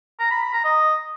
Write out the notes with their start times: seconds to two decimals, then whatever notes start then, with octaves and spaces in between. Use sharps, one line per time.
0.20 A#5
0.31 B5
0.42 B5
0.53 A#5
0.64 D#5